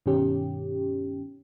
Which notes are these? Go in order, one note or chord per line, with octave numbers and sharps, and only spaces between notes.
G2 B2 D#3 C#4 G4